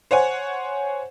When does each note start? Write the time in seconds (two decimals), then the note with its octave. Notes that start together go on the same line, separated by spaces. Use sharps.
0.11 C5 C#5 F#5 G#5